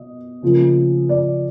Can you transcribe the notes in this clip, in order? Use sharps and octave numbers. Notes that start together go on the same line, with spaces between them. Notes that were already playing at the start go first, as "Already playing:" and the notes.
Already playing: B2 D#5
C#3 F3 A#3
D5